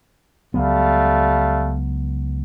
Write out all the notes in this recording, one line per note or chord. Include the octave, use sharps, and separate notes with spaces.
C#2 F#3 G3 A3 B3 F5